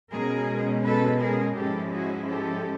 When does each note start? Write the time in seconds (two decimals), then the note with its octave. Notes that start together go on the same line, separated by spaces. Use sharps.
0.11 B2 G#3 C#4 G#4 A#4
0.84 A4 B4
1.20 G#4 A#4
1.56 G#2 F3 G#3 C#4 E4 G4 A4
1.92 F#4 G#4
2.28 G4 A4